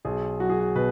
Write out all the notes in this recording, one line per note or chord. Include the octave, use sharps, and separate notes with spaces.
B1 G#4
F#3 F#4
G#4
F#4
B2 B4